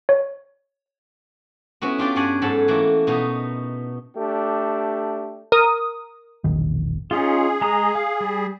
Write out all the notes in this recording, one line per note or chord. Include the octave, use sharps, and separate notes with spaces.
C#5
B3 C#4 E4 F#4
D4 F4 G4 D5
G2 C#4 C#5 D5 F#5 G#5
G#2 F#3 F#4 A4 A5 B5
E3 A3 A#3 E4 F#4
B2 B3 D#4
A3 D4 G4
A#4 D#6
E1 A#1 D#3
C#4 D#4 F4 G#4
G#3 A#5 D#6
F5
G3